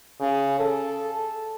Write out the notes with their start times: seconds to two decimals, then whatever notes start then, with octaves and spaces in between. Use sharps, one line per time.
0.20 C#3
0.59 A4